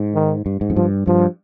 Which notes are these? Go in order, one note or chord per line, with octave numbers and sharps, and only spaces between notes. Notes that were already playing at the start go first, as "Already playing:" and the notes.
Already playing: G#2
D#3
G2
G#2
F2
G2 F3
G2 F3